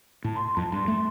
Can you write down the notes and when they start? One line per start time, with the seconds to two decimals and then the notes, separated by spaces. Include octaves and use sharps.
0.24 A2 A5
0.35 C6
0.46 C6
0.56 F2 A5
0.72 G2 C6
0.88 A3